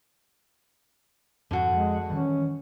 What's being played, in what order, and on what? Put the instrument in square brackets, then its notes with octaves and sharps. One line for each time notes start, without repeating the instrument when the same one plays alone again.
[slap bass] F2 G#2 [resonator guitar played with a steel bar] D3 F#4
[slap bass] F2 [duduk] G#3
[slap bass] D#3 E3 G3 [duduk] C#4